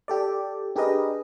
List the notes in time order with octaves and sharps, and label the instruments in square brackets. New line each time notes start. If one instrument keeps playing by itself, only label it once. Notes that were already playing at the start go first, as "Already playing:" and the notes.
[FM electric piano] G4 A4 D5
D4 G4 G#4 A#4 B4 D#5